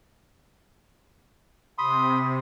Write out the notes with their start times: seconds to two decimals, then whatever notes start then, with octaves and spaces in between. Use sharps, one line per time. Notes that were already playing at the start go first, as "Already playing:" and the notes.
1.78 C3 B5 C6 D#6